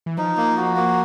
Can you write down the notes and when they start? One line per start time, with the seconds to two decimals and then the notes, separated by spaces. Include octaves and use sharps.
0.06 E3
0.18 F3 D#4
0.37 A#3
0.57 F#4
0.76 A#3